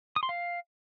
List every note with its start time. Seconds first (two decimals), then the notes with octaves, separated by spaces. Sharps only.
0.16 D#6
0.23 C6
0.29 F5